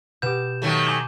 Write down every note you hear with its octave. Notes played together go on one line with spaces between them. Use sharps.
B2 G4 G6 E7
D#3 F#3 A3
G#5 D6 G6 G#6